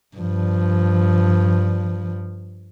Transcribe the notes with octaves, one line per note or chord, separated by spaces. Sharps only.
G2 F3